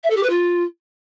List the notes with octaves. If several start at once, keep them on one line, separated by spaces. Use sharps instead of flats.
E5
A4
G4
B4
F4